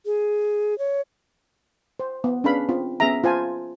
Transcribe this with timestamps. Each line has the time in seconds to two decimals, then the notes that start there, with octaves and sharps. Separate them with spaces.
0.06 G#4
0.79 C#5
2.00 C5
2.24 B3
2.44 C#4 D4 G#4 B4 F5 B5
2.69 C4 F4
3.00 B3 C#4 G#4 E5 A#5
3.24 F4 C5 G#5 A5